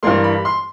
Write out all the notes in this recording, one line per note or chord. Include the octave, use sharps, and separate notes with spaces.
G2 E3 G3 A#3 C6
B5
C6